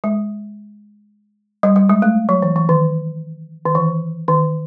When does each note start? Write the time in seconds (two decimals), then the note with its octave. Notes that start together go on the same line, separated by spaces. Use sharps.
0.04 G#3
1.63 G3
1.76 G3
1.89 G#3
2.02 A3
2.29 F#3
2.42 E3
2.56 E3
2.69 D#3
3.65 D#3
3.75 E3
4.28 D#3